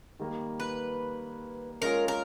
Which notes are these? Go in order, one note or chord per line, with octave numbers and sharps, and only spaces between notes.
D#3 G3 A#3
B4
G#3 C#4 F4 G#4 A#4
A#4